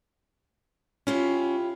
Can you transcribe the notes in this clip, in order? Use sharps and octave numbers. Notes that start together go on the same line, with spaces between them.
C#4 E4 F4 G4